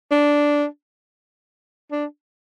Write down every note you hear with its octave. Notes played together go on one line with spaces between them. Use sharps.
D4
D4